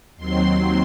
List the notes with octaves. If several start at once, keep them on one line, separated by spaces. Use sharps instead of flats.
D#2 D#3 F#3 C4 C6